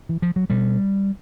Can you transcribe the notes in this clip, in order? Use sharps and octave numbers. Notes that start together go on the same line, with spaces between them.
E3
F3
F#3
B2 G3